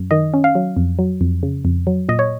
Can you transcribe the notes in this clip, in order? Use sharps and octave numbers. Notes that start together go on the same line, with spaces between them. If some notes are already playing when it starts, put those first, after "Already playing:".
Already playing: F#2
D#3 D#5
C#4
F5
F#3
F2
F#3
F2
C#3
F2
F#3
A#2 D#5
C#5